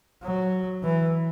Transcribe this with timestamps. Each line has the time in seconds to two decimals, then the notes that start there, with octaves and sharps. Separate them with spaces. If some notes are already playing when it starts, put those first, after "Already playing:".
0.23 F#3
0.83 E3